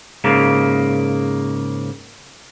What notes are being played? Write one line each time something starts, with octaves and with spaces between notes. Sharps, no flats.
G#2 C#3 A#3